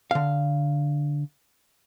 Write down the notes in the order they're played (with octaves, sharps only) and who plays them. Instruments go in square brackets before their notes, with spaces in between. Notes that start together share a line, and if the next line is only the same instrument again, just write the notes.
[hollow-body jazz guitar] D3 F5